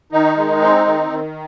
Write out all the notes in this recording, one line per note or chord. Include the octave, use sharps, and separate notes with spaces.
D#3 D#4
G#3
C4
D#3
D#3